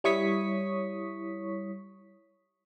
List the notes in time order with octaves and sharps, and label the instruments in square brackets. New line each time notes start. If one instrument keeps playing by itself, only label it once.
[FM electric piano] G3 E4 C#5 C#6 D#6 B6